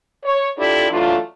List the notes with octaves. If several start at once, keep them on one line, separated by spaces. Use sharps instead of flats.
C#5
D4 E4 F4 G4 A4 D5
E3 F#3 A3 D4 F4